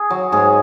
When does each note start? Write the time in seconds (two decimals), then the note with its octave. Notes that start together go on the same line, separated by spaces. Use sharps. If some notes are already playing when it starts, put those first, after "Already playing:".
Already playing: G#4
0.10 F#3
0.32 G#2 G#4